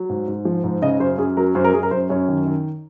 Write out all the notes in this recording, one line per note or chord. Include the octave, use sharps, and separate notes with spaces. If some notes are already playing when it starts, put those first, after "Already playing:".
Already playing: F#3
G#2
G#2
F3
G#2
C#3 D#5
F#2 C5
F#2 G#4
F#3 A#4
F#2 C5
A#4
F#2 G#4
A#4
F#2 C5
F#2 C#5
D#3
D#3